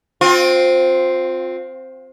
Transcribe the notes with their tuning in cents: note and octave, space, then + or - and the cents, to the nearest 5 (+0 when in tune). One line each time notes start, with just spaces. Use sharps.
C4 +0 F4 +30